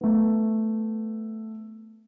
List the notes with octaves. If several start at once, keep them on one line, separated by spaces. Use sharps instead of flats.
A3 B3